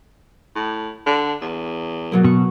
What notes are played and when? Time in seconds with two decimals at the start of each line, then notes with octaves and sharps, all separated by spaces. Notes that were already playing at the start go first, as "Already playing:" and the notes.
0.56 A2
1.07 D3
1.42 E2
2.12 B2 F#3 A#3
2.24 B2 C#6